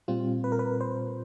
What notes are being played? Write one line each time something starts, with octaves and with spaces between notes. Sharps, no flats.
A#2 G3 C4 F4
B4
A#4
B4
C5